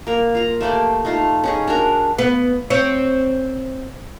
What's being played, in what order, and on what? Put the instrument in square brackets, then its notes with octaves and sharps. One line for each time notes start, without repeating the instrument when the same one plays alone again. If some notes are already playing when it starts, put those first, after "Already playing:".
[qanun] A#3 A#4
F4 A#5
A3 A#3 G4 D5
A3 D#4 F4
C#4 D#4 G#4
D4 F#4 A#4
[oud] B3
C4 C#5